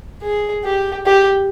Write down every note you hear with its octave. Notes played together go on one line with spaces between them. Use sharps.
G#4
G4
G4